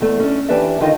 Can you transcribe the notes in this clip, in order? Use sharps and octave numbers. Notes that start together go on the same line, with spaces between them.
E2 A3
C#4 D4
E3 D4 G4 B4 D5 E5
D3 D#3 D#4 F4 A4 A#4